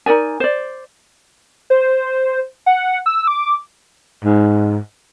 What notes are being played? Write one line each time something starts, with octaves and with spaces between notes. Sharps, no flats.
D#4 A#4 D5 G#5
C5 D5
C5
F#5
E6
D6
G#2